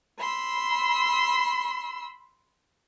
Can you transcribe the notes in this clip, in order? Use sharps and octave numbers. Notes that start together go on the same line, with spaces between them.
B5 C6 E6